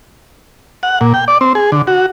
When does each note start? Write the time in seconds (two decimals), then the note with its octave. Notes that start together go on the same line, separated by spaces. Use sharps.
0.83 F#5
1.01 A#2
1.14 G5
1.28 D5
1.41 C4
1.55 G#4
1.72 D3
1.87 F#4